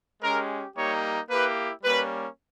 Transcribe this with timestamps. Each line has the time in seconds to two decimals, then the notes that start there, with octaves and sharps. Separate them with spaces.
0.23 G#3 C#4 G4 A#4
0.76 G3 A#3 D#4 G4 C#5
1.30 A#3 E4 G4 B4
1.84 G3 A#3 C#4 B4